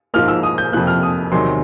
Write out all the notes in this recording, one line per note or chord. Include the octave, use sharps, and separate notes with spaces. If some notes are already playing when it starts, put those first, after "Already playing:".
G#2 F3 A#3 F6
E6
D#6
G6
F2 C3 F3 A#3 F#6
F6
D#6
E2 C3 D#3 F#3 C6